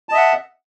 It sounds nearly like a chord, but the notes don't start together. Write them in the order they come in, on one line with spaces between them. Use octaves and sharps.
A5 D#5 E5 F#5